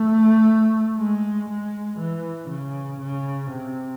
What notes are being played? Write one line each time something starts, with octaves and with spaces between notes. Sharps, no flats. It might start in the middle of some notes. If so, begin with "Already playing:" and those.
Already playing: A3
G#3
G#3
E3
C#3
C#3
C3